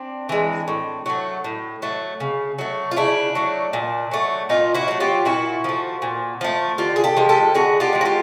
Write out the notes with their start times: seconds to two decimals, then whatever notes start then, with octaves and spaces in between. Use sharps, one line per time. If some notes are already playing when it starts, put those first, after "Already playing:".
Already playing: C4 D4
0.29 E3 G#3
0.68 A2
1.06 F#3 A3
1.44 A2
1.82 F#3 A3
2.20 C#3
2.59 F#3 A3
2.91 F4
2.96 C#3 D4 E4
3.35 F#3 A3
3.73 A#2
4.12 F#3 A3
4.49 A#2 D#4 F4
4.74 E4 F#4
4.88 F#3 A3
5.00 F4 G4
5.25 A#2 E4 F#4
5.64 F3 A3
6.02 A#2
6.41 F3 A3
6.78 D3 F4 G4
6.96 G#4
7.04 G4 A4
7.17 F3 G#3
7.29 G4 A4
7.54 D3 F#4 G#4
7.80 F4 G4
7.93 F3 G#3
8.01 F#4
8.05 F4 G4